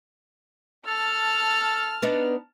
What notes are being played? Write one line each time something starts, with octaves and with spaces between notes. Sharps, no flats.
A4 A5 F6
B3 D4 D#4